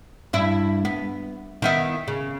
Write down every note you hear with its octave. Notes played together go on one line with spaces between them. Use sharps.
G2 E4
B3
D#3 B3 E4
C#3